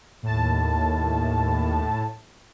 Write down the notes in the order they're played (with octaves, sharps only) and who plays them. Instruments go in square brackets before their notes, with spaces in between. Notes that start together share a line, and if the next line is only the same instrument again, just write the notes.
[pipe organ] D#2 [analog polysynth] A2 A5